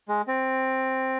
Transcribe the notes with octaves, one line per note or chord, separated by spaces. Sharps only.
G#3
C4